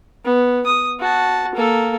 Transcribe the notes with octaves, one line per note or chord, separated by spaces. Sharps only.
B3
D#6
F#4 A5
A#3 A4